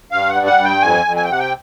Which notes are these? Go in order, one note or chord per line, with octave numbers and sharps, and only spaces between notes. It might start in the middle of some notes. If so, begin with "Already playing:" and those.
G2 F5
F#5
G3
F#5
G2
G5
F2 G#5
F2
G#5
G5
C3 F#5
G5